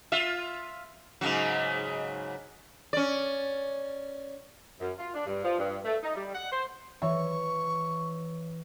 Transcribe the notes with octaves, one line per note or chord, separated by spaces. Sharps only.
F4 E5
G#2 C#3 F#3
C#4 D5
F#2
F4
D4
G2
F3
G2
A3
D#4
G3
F#5
C5
E3 C#5 E5 C#6